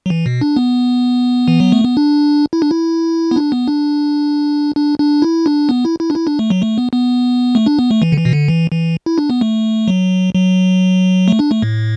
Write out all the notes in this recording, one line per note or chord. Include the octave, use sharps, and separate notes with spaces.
F#3
E3
B2
D4
B3
E3
F#3
A3
B3
D4
E4
D4
E4
B3
D4
B3
D4
D4
D4
E4
D4
B3
E4
E4
D4
E4
D4
A3
F#3
A3
B3
B3
A3
D4
B3
A3
E3
D3
E3
B2
D3
E3
E3
E4
D4
B3
A3
F#3
F#3
A3
D4
A3
A2